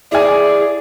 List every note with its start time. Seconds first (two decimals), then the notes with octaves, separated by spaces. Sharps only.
0.12 E4 G#4 D5 G#5